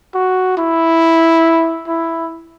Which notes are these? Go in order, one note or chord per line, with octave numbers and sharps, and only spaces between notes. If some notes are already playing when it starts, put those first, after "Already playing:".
F#4
E4
E4